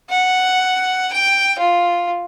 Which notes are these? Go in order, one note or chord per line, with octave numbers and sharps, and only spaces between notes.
F#5
G5
F4